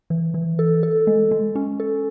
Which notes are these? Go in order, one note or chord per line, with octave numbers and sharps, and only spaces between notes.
E3
E3
A4
A4
G#3
G#3
C#4
A4